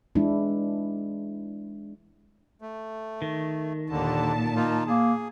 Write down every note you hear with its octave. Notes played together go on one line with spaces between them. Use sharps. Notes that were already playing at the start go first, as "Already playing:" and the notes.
E3 G#3 D4 E4
A3
D#3
D#2 A#2 D3 A5
A#3 D#4 F4
A#3 G#4